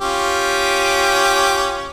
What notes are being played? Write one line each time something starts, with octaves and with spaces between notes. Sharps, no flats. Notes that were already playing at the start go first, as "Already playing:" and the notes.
C#4 F4 G4